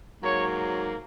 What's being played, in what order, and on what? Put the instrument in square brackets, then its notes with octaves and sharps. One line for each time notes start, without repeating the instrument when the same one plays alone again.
[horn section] G#2 F#3 A#3 C#5